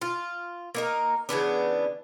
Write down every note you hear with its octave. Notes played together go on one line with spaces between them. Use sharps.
F4
A#3 D#4 A#4
C#3 E3 B3 D4